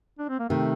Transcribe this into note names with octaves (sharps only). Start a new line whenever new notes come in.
D4
C4
A#3
C3 D#3 A3